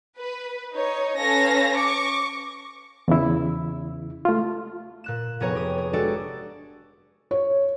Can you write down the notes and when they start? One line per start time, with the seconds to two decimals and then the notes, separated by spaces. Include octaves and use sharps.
0.17 B4
0.73 D#4 C#5
1.18 C#4 A4 B4 C#5 F5 A#6
1.74 C#6 D6
3.08 E2 C#3 E4
4.25 A3 F4
5.04 A#2 F#6 E7
5.40 F1 B3 G#4 C#5 A#5
5.55 G4 D#6
5.78 G#4
5.93 G#3 D4 F#4 G4 A4 D5
7.31 C#5